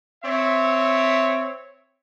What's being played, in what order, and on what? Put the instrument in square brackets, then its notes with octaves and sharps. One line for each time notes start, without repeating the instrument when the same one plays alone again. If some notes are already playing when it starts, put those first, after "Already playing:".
[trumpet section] C4 C#5 E5